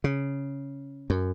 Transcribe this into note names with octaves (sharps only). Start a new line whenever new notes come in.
C#3
F#2